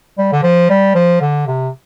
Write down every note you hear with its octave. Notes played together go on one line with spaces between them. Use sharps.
G3
D3
F3
G3
F3
D3
C3